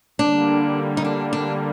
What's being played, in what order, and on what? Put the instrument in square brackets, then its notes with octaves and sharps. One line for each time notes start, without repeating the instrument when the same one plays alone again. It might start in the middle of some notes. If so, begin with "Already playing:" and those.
[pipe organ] D3 G3 A#3 [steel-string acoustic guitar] D4
[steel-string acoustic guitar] D#4
D4
D4